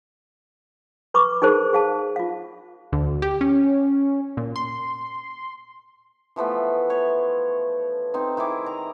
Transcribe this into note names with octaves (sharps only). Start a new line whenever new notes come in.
B4 B5 C#6 D6
D#4 G#4 A#4 C5 A5
G#4 F5 A5
F4 F5
D2
G4
C#4
A#2
C6
E3 F3 A3 B3
C#5 C#6
C4 D#4
D#3 E4 G#4 D6
D#5 A#5